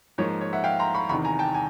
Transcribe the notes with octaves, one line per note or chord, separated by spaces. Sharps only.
G#2 F3 A#3 C#5
C#5
E5 F#5
F5 G5
A#5 C6
B5 C#6
E2 C3 D#3 B5 C#6
G#5 A#5
G5 A5
G#5